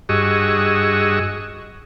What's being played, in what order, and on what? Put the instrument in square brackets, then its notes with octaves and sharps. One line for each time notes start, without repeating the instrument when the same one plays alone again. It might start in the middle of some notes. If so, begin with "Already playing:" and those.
[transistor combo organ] G2 F#4 G#4 D#5 C#6 E6